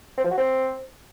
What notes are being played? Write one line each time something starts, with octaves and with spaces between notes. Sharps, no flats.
C4
F3
F#4
C4